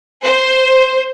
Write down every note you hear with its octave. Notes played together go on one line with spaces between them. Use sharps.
C5